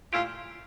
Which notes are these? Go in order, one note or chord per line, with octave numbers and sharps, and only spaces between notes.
A#2 A3 E4 F4 G4